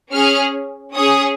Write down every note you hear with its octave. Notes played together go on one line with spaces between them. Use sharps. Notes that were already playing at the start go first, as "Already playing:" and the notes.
C#4 G#4 F6
C#4 G#4 D#6